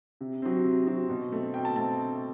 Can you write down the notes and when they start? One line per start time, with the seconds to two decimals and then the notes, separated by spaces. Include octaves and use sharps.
0.21 C3
0.42 F#3 C4
0.64 C3
0.87 F#3 C4
1.09 B2
1.32 A3 C4
1.54 B2 G5
1.65 A5
1.76 A3 C4 A5